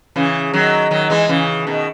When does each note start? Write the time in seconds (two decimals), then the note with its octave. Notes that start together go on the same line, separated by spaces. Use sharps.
0.16 C#3 E3
0.54 D#3 F#3
0.91 D#3 F#3
1.10 E3 G#3
1.29 C#3 E3
1.67 B2 D#3